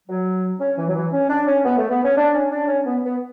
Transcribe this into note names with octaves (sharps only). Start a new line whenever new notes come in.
F#3
C#4
E3
F#3
E3
C#4
D4
C#4
B3
A3
B3
C#4
D4
C#4
D4
C#4
B3
B3